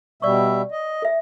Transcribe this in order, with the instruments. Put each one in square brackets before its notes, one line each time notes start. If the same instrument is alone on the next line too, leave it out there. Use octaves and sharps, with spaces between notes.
[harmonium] B2 G3 E5 [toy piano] D5 C#6
[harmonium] D#5
[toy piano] A4 E5